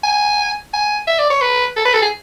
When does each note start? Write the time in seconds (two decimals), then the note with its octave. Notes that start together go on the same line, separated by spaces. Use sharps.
0.03 G#5
0.73 G#5
1.07 E5
1.19 D5
1.30 C#5
1.41 B4
1.76 A4
1.85 B4
1.94 A4
2.02 G#4